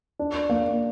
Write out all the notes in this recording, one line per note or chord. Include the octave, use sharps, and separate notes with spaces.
D4
A#3